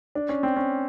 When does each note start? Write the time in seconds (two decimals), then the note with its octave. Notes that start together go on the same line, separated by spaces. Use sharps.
0.15 D4
0.29 C#4
0.43 C4
0.56 C#4